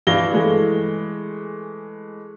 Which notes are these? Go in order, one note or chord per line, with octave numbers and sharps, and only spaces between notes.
G2 E3 F5 A#6 G7
E3 G#3 A3